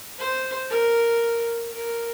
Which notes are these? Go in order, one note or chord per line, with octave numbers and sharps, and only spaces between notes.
C5
A#4
A#4